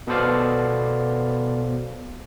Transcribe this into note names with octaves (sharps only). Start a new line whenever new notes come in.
B2 B3 A4 C5 D5 F5